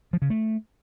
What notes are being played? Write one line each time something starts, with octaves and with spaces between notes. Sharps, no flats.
F3
C#3
A3